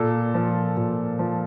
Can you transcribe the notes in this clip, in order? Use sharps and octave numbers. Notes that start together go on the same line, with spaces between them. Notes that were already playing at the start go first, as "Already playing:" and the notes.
Already playing: A#2 A4
F3
A#2
F3